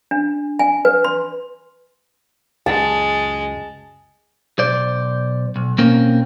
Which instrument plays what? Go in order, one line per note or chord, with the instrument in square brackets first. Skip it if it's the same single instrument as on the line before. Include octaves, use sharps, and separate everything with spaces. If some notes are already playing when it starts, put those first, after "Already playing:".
[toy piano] D4
G#5
B4
C6
[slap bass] C#2 F#2 [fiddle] G#3 [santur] A5
[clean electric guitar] B1 C5 D5
B1
B2 A#3 C4 C#4 A#4